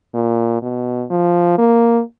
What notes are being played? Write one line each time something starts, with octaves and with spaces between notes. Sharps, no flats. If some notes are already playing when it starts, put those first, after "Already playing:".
A#2
B2
F3
A#3